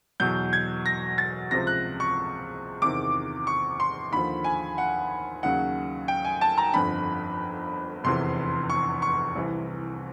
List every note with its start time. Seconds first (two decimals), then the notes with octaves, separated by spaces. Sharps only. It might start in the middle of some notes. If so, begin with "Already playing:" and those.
0.20 E2 B2 F#3 G6
0.53 G#6
0.86 A#6
1.18 A6
1.51 C#2 C3 F3 A#6
1.67 F#6
2.00 C#6
2.82 E2 C3 D#3 D6
3.47 C#6
3.80 C6
4.12 D#2 D3 F3 B5
4.44 G#5
4.78 F#5
5.43 D#2 C#3 F#3 F#5
6.08 G5
6.25 G#5
6.41 A5
6.58 A#5
6.74 G1 F2 D3 B5
8.04 F1 E2 C3 E3 C6
8.70 C#6
9.02 C#6
9.36 C2 C3 E3